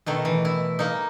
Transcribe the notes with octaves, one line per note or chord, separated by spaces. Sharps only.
B2 D#3 A3
E3
E4
A#3 D#4